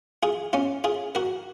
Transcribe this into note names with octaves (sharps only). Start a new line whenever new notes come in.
F4 G#4
C#4 F4
F4 G#4
F#4 A#4